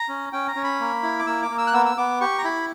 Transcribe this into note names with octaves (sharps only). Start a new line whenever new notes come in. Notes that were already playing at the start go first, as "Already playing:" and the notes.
Already playing: A#5
C#4
C#4 G5
A#5
C#4
B5
A#3
E4
D6
A#3 E6
D6
A#3
E6
F#6
B3 E6
E6
B3 D6
G4 C#6
A#5
E4 B5